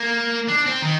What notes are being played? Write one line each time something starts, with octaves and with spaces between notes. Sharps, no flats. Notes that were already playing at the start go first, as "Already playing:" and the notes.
Already playing: A#3
D4
C4
D#3